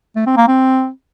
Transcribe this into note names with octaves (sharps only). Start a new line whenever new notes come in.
A3
C4
A#3
C4